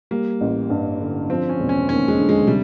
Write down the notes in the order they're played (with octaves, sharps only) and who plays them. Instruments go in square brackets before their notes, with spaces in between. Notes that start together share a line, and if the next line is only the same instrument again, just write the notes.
[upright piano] G3 [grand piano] A#3
[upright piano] A1
G2
D3
[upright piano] F3 [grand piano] C4
[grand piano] C#4
[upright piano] E1
[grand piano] C#4
[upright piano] D#2 [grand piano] C#4
[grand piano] G#3
[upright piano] D3
[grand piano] G#3
[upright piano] C3 [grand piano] G3